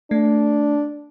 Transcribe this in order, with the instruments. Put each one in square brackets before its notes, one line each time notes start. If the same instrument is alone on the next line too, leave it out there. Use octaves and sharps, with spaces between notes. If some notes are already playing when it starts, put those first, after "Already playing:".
[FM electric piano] A3 [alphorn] D4